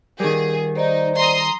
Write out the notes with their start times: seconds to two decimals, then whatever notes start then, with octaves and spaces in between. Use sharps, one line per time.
0.20 D#3 G3 G#4 A#4
0.76 D#4 C5 D5 D#5
1.20 A#5 C6 D#6